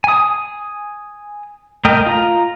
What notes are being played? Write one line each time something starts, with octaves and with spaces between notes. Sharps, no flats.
G#5 D#6
A3 A#4 D#5 G5
F4 A#5